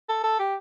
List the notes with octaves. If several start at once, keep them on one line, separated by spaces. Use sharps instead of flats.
A4
A4
G4